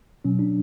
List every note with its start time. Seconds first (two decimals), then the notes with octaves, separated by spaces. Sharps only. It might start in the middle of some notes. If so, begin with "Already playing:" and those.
0.25 B2 F#3 C#4
0.39 D4